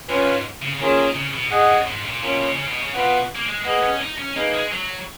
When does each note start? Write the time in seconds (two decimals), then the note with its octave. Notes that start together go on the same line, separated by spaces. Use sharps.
0.09 F#2 C#4 F4 B4 F5 G#5
0.27 G#2
0.62 C#3
0.74 C#3
0.79 D#3 A#3 C#4 F4 G#4
0.98 D#3
1.15 C#3
1.34 B2
1.51 G#2 G#4 D#5 F#5
1.69 F#2
1.87 G#2
2.05 A#2
2.22 B2 A#3 C#4 F4
2.40 B2
2.54 C#3
2.68 B2
2.82 C#3
2.93 B2 B3 F4 B4 F#5
3.36 A#3
3.47 G#3
3.64 A#3 G#4 B4 D#5 F#5
3.83 C#4
4.01 D#4
4.18 C#4
4.36 A#3 D#4 G#4 B4 F5
4.54 G#3
4.72 F#3